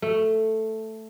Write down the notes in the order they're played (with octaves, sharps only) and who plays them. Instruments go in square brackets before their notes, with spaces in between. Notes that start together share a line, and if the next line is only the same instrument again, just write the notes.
[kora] A3